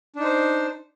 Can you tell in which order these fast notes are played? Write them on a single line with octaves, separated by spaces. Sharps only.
D4 D#4 C5